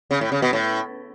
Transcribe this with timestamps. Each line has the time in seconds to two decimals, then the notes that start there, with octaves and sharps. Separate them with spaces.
0.11 C#3
0.21 A2
0.32 C#3
0.42 B2
0.53 A2